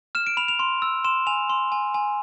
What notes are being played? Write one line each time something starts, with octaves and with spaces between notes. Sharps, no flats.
F6 E7
D7
B5 F7
F7
C6
E6
C6 E7
G#5 F7
C6
G#5
G#5